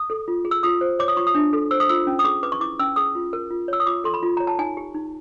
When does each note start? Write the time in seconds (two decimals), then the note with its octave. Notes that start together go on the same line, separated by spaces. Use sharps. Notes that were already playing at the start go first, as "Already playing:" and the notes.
Already playing: D#6
0.10 A4
0.28 F4
0.45 G#4
0.51 E6
0.63 F4 D#6
0.81 C5
0.99 C#5 D6
1.08 D#6
1.17 F4 C#6
1.27 D#6
1.35 D4
1.53 A4
1.71 C5 E6
1.80 D#6
1.89 F4 E6
2.07 C#4
2.19 D#6
2.25 G#4 D6
2.43 B4 D6
2.52 C#6
2.60 E4 D6
2.79 C#4 E6
2.96 G#4 D#6
3.15 F4
3.33 A#4
3.50 F4
3.68 C#5 E6
3.80 D#6
3.86 F4 D6
4.04 A4 C6
4.14 B5
4.23 F4
4.37 C#5 A#5
4.47 A5
4.58 D#4 G#5
4.77 G4
4.95 D#4